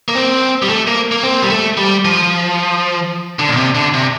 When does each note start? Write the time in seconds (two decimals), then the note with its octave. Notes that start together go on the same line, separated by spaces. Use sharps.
0.08 A#3
0.15 C4
0.62 G3
0.69 A3
0.87 A#3
1.12 A#3
1.23 C4
1.42 G3
1.50 A3
1.77 G3
2.05 F3
3.39 D3
3.49 A#2
3.57 C3
3.75 D3
3.94 C3